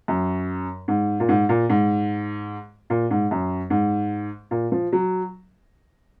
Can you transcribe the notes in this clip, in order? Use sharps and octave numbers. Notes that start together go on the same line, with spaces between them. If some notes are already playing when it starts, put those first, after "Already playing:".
F#2
G#2
A#2
G#2
A#2
G#2
A#2
G#2
F#2
G#2
A#2
F3
F#3